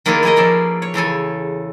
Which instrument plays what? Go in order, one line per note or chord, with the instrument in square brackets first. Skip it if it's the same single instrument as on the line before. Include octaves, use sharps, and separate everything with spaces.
[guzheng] D#3 A#3 E4 F4 G#4 A4
A#3 B3 G#4 A#4 D#5
F3 C#4 D5 E5
C#5
E2 C#3 A4 G#5